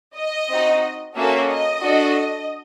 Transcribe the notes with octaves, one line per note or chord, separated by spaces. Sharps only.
D#5
C4 D#4 F#4
A#3 C#4 F#4 A4 E5
D#5
D4 F#4 A4